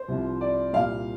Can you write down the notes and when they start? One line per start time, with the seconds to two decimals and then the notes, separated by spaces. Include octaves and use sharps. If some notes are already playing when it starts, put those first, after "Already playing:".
Already playing: C5
0.08 C2 C3 F3
0.41 D5
0.73 C2 A#2 G3 F5